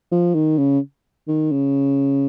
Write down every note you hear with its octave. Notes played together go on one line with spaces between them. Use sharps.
F3
D#3
C#3
D#3
C#3